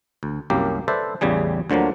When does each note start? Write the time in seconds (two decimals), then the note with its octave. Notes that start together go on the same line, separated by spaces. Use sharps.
0.23 D2
0.50 C2 F#2 A#3 G4
0.88 A4 B4 C5 D5 E5
1.21 A1 E2 C#3 G3 G#4
1.70 D2 D3 F3 F#3 A#3